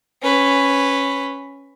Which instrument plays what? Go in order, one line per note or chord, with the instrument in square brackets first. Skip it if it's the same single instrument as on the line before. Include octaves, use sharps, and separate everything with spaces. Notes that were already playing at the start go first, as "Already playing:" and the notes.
[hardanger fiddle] C#4 B4